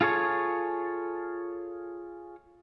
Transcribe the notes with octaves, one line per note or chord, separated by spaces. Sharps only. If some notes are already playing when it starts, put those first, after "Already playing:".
F4 G#4 A4 C#5